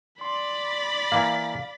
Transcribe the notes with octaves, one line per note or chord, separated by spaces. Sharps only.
D5 B5 C6
E3 A#3 F5